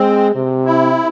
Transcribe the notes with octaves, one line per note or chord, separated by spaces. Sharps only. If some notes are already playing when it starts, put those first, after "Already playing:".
Already playing: G#3 C4
C3
E4